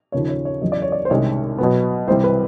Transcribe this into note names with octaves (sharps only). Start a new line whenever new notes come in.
D#2 C#3 F3 C#5
C#5
C#5
E2 C#3 F#3 D#5
D5
C#5
D5
C5
C2 C3 D#3 G#3 C#4 C#5
B2 F#3 B3
C2 C3 E3 G3 C5
B4